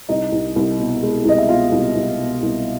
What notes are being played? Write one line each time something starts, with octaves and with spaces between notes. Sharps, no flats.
C2 D#4 D#5
C2
C2
B2
G#3
C2 D#5
E5
B2 F4 F5
C2
C2
B2
C2